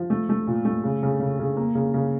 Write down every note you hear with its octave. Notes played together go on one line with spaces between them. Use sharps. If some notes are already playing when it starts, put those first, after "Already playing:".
Already playing: F3
A3
A3
A#2
A3
C#3
C#3
C#3
C#3
A#3
C#3
C#3